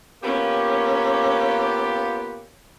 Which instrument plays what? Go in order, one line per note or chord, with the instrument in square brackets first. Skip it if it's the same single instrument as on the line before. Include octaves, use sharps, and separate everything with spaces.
[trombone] A#3 [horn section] B3 F4 G4 [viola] C#4